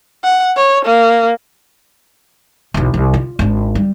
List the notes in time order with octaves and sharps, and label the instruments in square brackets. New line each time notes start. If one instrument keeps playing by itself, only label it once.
[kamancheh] F#5
C#5
A#3
[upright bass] B1 E2
C2
F4
G#1 D4
G3